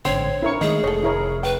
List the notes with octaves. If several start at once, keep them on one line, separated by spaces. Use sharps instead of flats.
A1 G#2 D3 C4 C#5 C6
C#4 D4 E4 A#4 C#6
D#3 G#3 A3 D#4 G#4
F1 A4 C#5 D#5
E4 A#4 C#5
B4 G5